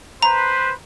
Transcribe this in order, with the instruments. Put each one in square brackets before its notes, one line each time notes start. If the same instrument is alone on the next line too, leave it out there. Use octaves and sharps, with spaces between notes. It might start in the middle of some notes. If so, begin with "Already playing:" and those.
[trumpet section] B4 C5 [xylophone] A#5